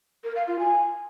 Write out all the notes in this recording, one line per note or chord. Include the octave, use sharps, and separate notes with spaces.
A#4
F5
F4
G#5